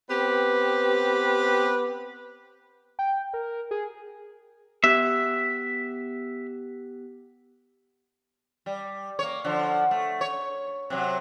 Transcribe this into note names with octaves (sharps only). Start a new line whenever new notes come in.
B3 C4 G4 B4
G5
A#4
G#4
B3 G4 E5 F#6
G3
A#3 C#5
D3 F3
A3
C#5
C3 F#3